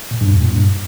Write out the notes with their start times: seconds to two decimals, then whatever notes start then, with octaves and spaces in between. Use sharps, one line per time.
0.11 A#2
0.21 G2
0.31 E2
0.41 A#2
0.52 G2